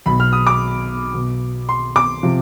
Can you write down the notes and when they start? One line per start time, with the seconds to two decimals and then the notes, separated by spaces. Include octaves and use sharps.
0.06 B1 B2 B5
0.20 F6
0.33 D#6
0.47 D6
1.14 B1 B2
1.69 C6
1.96 D6
2.23 C3 F3